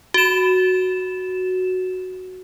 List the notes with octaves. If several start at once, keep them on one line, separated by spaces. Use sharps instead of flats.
F#4 E7